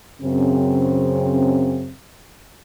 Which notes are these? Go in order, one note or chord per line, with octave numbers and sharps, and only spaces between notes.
F#2 C#3 C4